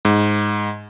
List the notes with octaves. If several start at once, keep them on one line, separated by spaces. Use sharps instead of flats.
G#2